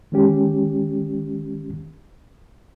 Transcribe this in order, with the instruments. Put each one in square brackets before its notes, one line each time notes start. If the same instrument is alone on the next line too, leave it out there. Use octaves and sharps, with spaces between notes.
[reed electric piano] D#3 G#3 C#4 G4